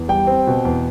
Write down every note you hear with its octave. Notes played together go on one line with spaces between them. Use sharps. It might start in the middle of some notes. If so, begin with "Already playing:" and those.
Already playing: E2
G3 G5
C4
B2
E2